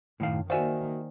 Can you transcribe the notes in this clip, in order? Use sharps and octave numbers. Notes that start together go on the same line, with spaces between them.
F#2 A2 D#3 F5
D#3 A#3 F#4 C5 D5 E5 F5 G#5